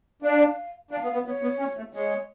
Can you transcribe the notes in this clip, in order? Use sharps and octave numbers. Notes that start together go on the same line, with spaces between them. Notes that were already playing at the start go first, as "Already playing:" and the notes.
D4 F5
D4 F5
B3
B3
B3 C#5
B3
C#4
A3
G#3 C#5